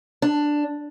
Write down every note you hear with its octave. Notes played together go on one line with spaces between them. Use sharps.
D4